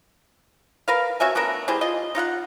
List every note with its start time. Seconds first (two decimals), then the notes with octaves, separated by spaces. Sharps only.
0.88 A#4 B4 F5
1.20 C#4 F#4 E5 G#5
1.35 A3 B3 D4 A#4
1.68 G3 E4 G#4 C5
1.81 F4 D#5
2.15 D#4 F4 F5 F#5